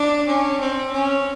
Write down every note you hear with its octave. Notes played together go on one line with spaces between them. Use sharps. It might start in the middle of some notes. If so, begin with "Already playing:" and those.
Already playing: D4
C#4
C4
C#4